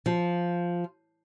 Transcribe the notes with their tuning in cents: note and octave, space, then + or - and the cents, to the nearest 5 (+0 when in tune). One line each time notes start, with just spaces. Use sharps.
F3 +0